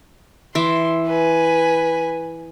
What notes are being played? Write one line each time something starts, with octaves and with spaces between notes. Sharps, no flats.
E3 E5 C6 D6
B4 G#5